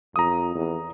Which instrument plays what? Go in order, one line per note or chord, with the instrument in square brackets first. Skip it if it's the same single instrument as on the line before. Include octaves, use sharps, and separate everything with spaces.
[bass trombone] F2 [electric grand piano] A#5 D#6
[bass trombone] E2